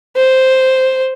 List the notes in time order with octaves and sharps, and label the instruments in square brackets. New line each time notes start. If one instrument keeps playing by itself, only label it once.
[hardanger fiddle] C5